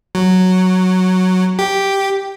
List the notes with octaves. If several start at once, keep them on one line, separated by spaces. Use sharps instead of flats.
F#3
G4